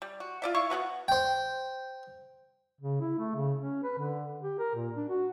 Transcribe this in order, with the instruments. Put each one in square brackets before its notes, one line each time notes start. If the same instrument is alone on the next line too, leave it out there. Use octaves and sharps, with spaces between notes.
[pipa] G3
F#4
F4 D5 E5
E4 F5 C#6
B3 C#4 F#4 B4
[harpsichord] C5 G5
[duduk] C#3
E4
A3
C#3
C#4
B4
D3
G4
A#4
A#2
D4
F#4